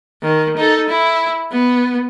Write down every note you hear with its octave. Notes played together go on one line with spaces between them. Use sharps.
D#3
D#4 A4
E4
B3